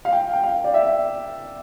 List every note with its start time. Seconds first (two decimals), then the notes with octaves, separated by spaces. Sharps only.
0.05 F5
0.12 G5
0.33 G5
0.43 F5
0.64 D5
0.74 E5